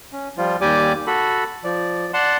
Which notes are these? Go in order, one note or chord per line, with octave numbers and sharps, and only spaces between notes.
C#4
F3 G3 F4
D#2 G3 G4 D5 G#5 D6
F#4 A4 B5
F3 D5
D5 F#5 A5 C6